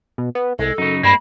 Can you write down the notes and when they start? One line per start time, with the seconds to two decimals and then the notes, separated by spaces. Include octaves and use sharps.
0.18 B2
0.35 B3
0.59 C2 G#3 A4
0.78 F#2 C#3 D#4
1.03 G2 G#3 A#3 C4 B5